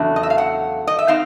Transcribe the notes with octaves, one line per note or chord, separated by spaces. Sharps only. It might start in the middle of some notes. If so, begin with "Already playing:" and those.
Already playing: E2 C#3 F#3 A3 D4
D#5
E5
F5
F#5
D#5
E5
C4 D#4 F5